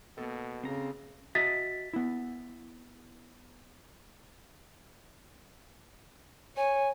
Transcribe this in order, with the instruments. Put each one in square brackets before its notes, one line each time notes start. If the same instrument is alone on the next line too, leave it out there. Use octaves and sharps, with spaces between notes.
[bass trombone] B2 [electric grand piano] A#3 B3 A4
[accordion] C#3 [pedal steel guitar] C4 A#5
[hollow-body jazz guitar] F#4 D#5 E5 [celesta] A6 B6
[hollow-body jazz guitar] B3 E4
[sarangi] C#5 [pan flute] G#5